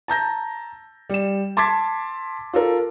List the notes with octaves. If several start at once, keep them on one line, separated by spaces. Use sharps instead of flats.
A5 A#5 G6 A#6
G3 E7
A5 C6 D6 G#6 A6 B6
F4 A4 A#4